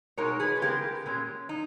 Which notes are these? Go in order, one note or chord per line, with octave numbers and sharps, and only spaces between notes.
B2 G#3 D#4 A#4 C#5
G#4 B4
C#3 G#3 B3 G4 A#4
A#2 G#3 C#4
D#4